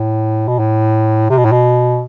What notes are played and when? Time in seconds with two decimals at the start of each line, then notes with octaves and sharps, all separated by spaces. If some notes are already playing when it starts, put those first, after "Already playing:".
Already playing: A2
0.48 B2
0.59 A2
1.30 C3
1.38 B2
1.45 A2
1.52 B2